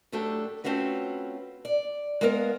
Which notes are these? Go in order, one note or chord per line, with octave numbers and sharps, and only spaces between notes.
A2 F#3 A3 D4 G4 A4
A3 C4 C#4 F4 F#4 B4
D5
G#3 A#3 B3 A#4 D#5 F5